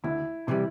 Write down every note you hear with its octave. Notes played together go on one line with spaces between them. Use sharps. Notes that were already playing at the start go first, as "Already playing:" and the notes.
D2 E4
C3 E3 G3 E4